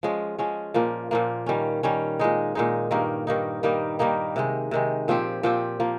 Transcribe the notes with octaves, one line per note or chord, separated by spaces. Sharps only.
F3 G#3 C#4
F3 G#3 C#4
A#2 F3 A#3
A#2 F3 A#3
D#3 G3 C#4
D#3 G3 C#4
A#2 G#3 D#4
A#2 G#3 D#4
G2 D#3 A#3 D#4
G2 D#3 A#3 D#4
D#3 G3 A#3 D#4
D#3 G3 A#3 D#4
C3 D#3 G#3
C3 D#3 G#3
A#2 F3 C4 G4
A#2 F3 C4 G4
F3 A#3